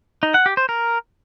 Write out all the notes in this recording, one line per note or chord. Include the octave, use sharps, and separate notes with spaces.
D#4
F#5
G4
C5
A#4